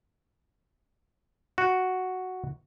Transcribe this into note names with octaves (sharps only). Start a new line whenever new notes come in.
F#4